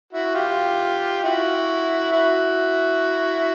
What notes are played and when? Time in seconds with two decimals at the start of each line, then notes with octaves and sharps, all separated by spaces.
0.13 E4 F#4
0.35 F4 G4
1.23 E4 F#4
2.12 E4 F#4